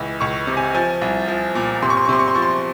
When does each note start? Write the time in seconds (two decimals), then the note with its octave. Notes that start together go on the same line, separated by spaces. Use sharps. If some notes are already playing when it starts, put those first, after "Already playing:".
Already playing: C#2 E3
0.20 C#2 C#6
0.47 C3
0.57 G#5
0.75 F3 G#5
1.01 C2
1.28 F3
1.55 A#2
1.82 C3 C6
1.90 C#6
1.97 C6
2.05 C#6
2.09 C3 C6
2.19 C#6
2.28 C6
2.35 F3 C#6
2.42 C6